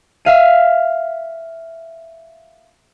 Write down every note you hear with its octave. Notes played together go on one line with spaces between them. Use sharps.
E5 F5 D#7